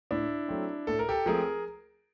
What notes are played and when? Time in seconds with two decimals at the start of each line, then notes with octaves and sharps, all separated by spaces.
0.11 A2 D4 E4
0.48 F#3 A3 C4
0.87 A2 A4
0.99 A#4
1.09 G4 A4
1.26 F3 A3 C4 G#4 A#4